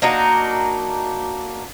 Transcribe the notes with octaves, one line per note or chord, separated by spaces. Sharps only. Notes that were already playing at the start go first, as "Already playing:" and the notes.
A#3 D4 D#4 F#4